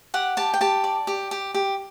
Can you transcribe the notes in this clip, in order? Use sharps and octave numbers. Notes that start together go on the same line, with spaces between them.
G4 F#5
G4 A5
G5
G4 A5
D5
G4
G4
G4